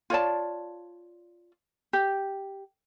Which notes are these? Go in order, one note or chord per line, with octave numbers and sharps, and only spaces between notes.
F4 C#5 D5 A5
G4